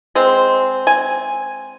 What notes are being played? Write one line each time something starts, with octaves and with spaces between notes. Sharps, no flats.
G#3 C4
G#5